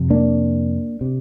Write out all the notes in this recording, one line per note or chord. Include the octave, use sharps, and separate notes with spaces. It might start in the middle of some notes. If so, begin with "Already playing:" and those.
Already playing: F2 C3
A#3 D4
C3